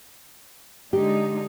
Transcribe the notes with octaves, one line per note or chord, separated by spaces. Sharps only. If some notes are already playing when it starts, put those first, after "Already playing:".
D3 G#3 D#4 G4